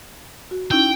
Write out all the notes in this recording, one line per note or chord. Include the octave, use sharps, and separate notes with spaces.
F#4
C#4 D#4 E4 G5